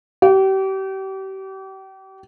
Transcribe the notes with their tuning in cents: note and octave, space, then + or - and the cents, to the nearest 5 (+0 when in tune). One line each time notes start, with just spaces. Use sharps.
G4 -35